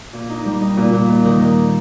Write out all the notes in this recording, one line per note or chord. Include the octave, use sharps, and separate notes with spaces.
A#2
D#4
G3
D#4
A#2
A#2
D#2
D#3
D#3